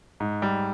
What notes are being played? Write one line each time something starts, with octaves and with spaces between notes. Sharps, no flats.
G#2
G3